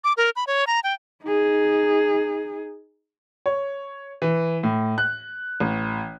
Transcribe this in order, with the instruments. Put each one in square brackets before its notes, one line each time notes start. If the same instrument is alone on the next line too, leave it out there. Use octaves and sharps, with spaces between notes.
[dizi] D6
A#4
B5
C#5
A#5
G5
[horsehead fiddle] D#4 G#4
[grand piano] C#5
E3
A2
F#6
A1